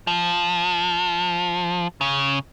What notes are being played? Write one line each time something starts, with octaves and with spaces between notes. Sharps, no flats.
F3
C#3